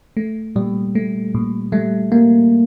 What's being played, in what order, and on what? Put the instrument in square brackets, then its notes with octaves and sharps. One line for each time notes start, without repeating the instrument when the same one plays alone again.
[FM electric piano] A3
[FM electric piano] A#2 [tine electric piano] G3
[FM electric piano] A3
A#2
[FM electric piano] G3 [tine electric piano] A3
[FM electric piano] G3 [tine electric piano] A#3